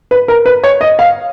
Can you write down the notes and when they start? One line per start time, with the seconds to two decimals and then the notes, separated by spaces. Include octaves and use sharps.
0.11 B4
0.28 A#4
0.46 B4
0.64 C#5
0.81 D#5
0.99 F5